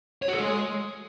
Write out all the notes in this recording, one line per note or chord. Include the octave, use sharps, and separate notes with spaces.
C#5
F#4
A4
G#3